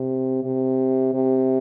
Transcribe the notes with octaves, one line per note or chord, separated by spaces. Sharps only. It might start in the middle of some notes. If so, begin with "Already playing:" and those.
Already playing: C3
C3
C3